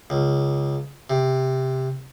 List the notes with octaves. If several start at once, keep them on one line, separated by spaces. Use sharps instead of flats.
C#2
C3